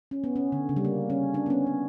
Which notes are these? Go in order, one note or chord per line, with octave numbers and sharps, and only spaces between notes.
C#4
B3
C#4
D3
C#3
G3
A#3
C#4
D4
B3
C#4
B3